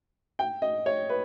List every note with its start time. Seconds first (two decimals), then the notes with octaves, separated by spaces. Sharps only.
0.39 G5
0.62 D#5
0.86 C#5
1.09 B4